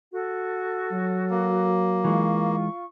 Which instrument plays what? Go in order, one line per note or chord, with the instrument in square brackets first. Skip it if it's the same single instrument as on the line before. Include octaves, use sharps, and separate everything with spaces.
[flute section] F#4 A4
[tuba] F#3
[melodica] A#3
[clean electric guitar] E3 G#3 [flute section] F4 C#6